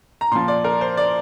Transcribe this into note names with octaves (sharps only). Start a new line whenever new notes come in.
A#5
A#2 F3 C6
D5
A#4
C5
D5